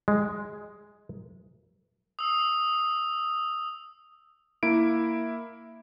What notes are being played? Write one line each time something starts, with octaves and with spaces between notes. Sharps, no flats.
G#3
D#6 E6
A#3 E4 D7